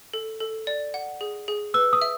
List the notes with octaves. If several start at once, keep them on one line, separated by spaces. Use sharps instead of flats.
A4
A4
D5
F#5
G#4
G#4
B4 E6
D#6
E5